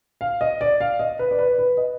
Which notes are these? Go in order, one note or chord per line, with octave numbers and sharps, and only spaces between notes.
F5
D#5
D5
F5
D#5
B4
D5
B4
B4
D#5